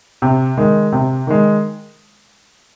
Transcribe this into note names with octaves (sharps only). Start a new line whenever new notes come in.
C3
D#3 G#3
C3
D#3 G#3